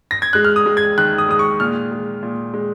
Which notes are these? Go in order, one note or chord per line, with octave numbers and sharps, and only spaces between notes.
A#6
G#6
G#3 F#6
F6
D#6
G#3
G#6
D#3 F#6
D#6
G#3 D#6
C#6
A#2 F6
G#3
A#2
G#3